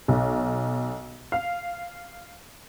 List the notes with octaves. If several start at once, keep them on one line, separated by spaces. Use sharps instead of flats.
B1
F5